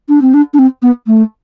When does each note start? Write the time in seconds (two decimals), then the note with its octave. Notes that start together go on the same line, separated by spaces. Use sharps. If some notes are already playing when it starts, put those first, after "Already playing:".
0.09 D4
0.21 C4
0.34 D4
0.53 D4
0.59 C4
0.82 B3
1.07 A3